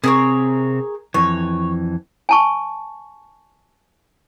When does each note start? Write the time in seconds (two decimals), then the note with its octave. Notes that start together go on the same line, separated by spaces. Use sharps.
0.04 C3 C4 G#4 A#4 C#5
1.14 F2 E3 C#5
2.29 G#5 A5 C#6